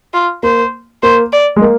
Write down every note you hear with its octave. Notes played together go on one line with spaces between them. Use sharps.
F4
A#3 C5
A#3 C5
D5
G#3
A#3